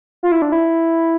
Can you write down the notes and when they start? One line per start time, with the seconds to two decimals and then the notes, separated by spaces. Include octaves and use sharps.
0.23 F4
0.32 E4
0.42 D4
0.52 E4